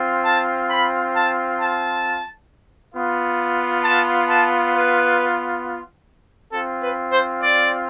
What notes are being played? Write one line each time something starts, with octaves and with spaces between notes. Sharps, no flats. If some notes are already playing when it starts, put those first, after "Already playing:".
Already playing: C4 F4
A5
B5
A5
A5
B3 F4
A5
A5
B4
C4 F4 A4
B4
C5
D5